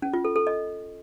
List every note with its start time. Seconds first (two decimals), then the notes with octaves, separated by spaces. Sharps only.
0.02 C#4
0.13 F4
0.25 A4
0.36 A4
0.47 D#5